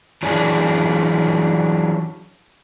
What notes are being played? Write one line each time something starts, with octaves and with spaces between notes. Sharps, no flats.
E3 F#3 C#4 D4 G#4